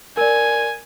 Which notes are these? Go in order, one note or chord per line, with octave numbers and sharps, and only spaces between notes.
A#4 D5 G#5